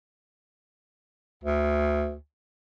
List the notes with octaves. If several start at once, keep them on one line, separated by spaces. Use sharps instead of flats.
D2